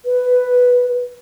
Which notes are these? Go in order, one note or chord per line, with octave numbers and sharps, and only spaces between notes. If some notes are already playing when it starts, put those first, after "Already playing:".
B4